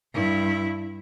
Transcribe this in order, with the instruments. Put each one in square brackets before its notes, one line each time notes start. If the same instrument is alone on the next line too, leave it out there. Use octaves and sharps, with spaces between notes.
[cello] G2 E4